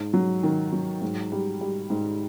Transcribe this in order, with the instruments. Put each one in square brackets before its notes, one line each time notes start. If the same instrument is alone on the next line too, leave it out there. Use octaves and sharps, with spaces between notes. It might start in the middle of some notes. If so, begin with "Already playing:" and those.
Already playing: [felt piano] G#2
F#3
D#3
F#3
G#2
G3
G3
G#2